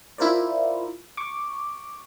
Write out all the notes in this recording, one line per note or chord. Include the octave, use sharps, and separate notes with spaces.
E4 F4 A#4 C5 D5
C#6 D6